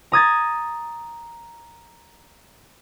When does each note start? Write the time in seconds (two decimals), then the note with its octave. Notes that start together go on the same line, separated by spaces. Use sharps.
0.12 A#5 D#6 G#6 A6